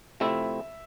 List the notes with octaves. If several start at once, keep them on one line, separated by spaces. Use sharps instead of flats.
C3 F3 A3 C4 E4 E5